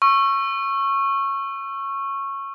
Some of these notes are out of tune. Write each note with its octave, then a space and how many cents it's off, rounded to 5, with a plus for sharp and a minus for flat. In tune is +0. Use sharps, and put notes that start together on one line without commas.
C#6 -15 E6 +30